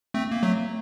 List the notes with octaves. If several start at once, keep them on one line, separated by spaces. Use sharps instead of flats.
A3 C4
A#3
F#3 A3